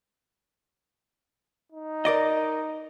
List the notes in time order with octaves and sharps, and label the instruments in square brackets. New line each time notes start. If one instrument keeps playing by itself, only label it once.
[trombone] D#4
[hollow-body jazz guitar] A#4 D5 D#5